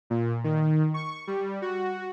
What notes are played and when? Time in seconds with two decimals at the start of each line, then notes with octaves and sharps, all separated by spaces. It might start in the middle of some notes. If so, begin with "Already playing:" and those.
0.10 A#2
0.44 D#3
0.94 C#6
1.27 G3
1.62 F#4